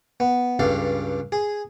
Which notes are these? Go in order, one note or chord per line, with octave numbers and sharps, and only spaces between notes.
B3
C#2 G2 A4 F5
G#4